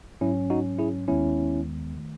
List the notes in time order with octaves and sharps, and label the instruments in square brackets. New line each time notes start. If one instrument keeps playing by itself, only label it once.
[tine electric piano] G#2 F#3 C#4 E4
D#4 F#4
E4 G#4
D#2 D#3 G#3 B3 C#4 E4
D#3 A3